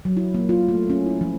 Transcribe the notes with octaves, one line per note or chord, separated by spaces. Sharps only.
F#3
E4
A#3
F4
A3
C#4
E4
F3